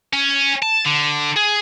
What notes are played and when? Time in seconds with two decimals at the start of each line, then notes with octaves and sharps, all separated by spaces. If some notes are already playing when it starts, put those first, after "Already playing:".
0.13 C#4
0.63 A5
0.85 D3
1.37 G#4